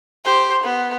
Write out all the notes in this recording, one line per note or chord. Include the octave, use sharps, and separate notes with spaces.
G4 C5
B3